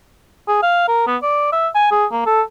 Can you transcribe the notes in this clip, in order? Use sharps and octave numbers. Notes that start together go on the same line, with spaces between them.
G#4
F5
A#4
B3
D5
E5
G#5
G#4
A#3
A4